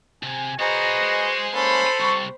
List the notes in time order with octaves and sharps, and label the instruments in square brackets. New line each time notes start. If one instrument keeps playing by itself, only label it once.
[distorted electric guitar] C3 [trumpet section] G#5
[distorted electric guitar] B3 A#5 [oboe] F#4 [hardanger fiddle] G#4 C5 [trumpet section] B4 D#5
[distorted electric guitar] G#3
[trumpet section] A#3 C#4 [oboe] A4 [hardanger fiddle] C5 B5
[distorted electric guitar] C2 C3 [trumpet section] C#6